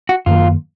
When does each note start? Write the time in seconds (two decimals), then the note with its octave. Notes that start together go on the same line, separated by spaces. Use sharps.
0.09 F#4
0.26 F#2 D#3 A#3 F4